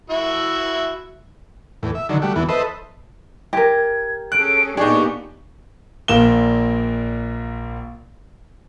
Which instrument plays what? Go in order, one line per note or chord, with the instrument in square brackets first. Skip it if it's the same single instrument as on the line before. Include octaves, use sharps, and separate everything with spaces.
[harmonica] E4 F#4 E5
[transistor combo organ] E2 A2
E5
D3 D#3 F#3
G3 A3 F#4
E2 E3 B3
A4 B4 C5 D#5 E5
[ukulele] G4 A#4 [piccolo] G#6
[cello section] C#4 G#4 A4 [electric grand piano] F#6 [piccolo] D7
[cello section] A#2 B3 G4 [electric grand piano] D4 D#4 [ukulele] G#4 [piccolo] C#6
[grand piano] A#1 A#2 A#3 E7 G7